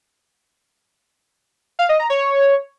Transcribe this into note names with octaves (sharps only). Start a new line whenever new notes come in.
F5
D#5
A#5
C#5